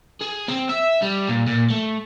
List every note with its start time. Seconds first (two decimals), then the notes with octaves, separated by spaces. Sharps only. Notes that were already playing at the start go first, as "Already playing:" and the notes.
0.21 G#4
0.48 C4
0.69 E5
1.02 G3
1.29 A#2
1.47 A#2
1.70 A3